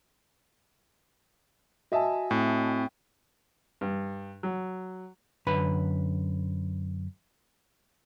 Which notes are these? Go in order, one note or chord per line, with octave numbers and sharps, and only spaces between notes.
F#4 D#5 E5 G#5 A5
A2 C4
G2
F#3
F#2 D3 B4 B5